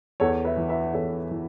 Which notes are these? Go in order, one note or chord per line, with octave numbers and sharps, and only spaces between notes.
E2 A4 C#5
B4 E5
E3
B4 E5
E2 A4 C#5
E3